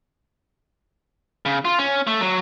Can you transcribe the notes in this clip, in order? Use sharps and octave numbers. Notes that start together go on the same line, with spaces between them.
C#3
F4
C#4
A3
F#3